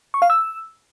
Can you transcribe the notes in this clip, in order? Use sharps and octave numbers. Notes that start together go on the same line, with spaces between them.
C#6
F5
E6